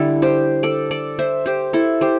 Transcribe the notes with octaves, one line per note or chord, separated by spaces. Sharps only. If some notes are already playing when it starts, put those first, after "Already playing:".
Already playing: D3 G3 E4 A4
G4 C5
A4 D5
A4 D5
C5 E5
G4 C5
E4 A4
G4 C5